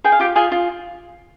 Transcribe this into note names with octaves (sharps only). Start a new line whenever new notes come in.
G#4 G5
F5
F4 G4 G5
F4 G#4 G#5
F4